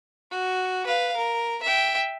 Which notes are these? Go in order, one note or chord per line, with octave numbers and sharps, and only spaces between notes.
F#4
B4 F5
A#4
E5 G5